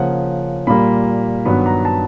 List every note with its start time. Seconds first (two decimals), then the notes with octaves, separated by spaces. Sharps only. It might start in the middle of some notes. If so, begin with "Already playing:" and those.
Already playing: C#3 F3 A#3 F#5
0.67 A#2 G3 A#3 B5
1.45 G2 D#3 F#3 B3 B5
1.66 A#5
1.85 A5